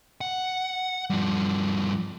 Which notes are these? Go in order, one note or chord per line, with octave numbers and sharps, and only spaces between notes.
F#5
G2 F3